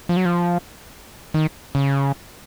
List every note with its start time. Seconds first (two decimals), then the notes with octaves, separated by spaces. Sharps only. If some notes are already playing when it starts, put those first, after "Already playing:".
0.09 F3
0.17 F#3
0.25 F3
1.34 D#3
1.75 C#3